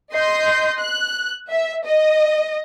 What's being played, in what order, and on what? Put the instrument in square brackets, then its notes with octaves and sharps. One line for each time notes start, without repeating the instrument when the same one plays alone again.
[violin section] D#5 C6 G6
F#6
E5
D#5